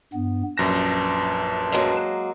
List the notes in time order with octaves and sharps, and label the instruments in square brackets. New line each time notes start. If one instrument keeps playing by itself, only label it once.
[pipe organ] G2 B3
[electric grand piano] A#1 F#2 A#6 [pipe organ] B4 A5
[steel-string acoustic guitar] F#3 G#3 A#3